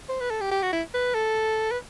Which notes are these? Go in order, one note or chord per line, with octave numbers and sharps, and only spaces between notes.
C5
B4
A4
G4
G4
F#4
E4
B4
A4
B4